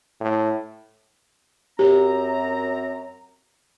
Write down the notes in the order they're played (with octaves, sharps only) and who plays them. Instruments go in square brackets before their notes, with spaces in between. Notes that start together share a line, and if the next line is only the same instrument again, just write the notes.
[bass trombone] A2
[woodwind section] F#2 C4 A#5 [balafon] G4